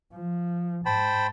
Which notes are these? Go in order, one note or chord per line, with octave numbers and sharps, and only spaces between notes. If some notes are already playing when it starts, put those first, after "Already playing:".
F3
G#2 C5 G5 A5 B5